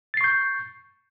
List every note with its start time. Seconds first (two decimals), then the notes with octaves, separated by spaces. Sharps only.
0.14 A6
0.17 C7
0.21 C#6
0.24 G6